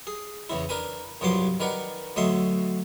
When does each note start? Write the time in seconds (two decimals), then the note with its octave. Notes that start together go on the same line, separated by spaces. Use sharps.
0.07 G#4
0.49 E2 C#3 E4
0.69 D4 A#4 B4 G#5
1.21 C2 G2 F3 F#3 C6 D6
1.60 D#3 A#4 B4 D5 F#5
2.16 D2 F#3 D#5 E5 C6 C#6